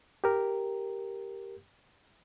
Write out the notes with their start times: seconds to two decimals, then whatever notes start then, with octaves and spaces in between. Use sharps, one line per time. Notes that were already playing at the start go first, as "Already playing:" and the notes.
0.24 G4 A#4